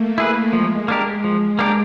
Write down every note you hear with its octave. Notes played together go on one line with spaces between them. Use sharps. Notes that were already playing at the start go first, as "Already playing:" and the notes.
Already playing: A3 A#3
E4 G#4 B4
F3 G#3
A#3 D4 G4 A#4
F3
A#3 D4 G4 A#4